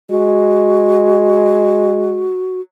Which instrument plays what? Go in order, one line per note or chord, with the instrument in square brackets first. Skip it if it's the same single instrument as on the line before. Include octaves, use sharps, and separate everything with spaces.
[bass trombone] G#3 [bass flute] F#4